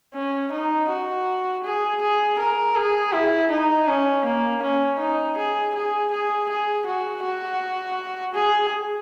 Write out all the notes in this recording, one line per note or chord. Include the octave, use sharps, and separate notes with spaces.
C#4
D#4
F#4
G#4
G#4
A#4
G#4
E4
D#4
C#4
A#3
C#4
D#4
G#4
G#4
G#4
G#4
F#4
F#4
G#4